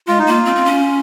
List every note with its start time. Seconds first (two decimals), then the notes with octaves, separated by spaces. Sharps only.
0.08 G#3 F4
0.19 D#4
0.27 A#3 F4
0.45 C4
0.56 C4
0.65 C#4